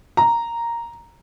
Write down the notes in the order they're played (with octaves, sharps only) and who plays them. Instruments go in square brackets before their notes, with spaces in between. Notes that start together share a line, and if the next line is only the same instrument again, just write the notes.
[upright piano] A#5